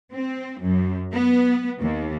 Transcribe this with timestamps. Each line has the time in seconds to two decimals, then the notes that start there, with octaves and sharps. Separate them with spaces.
0.12 C4
0.61 F#2
1.12 B3
1.80 D#2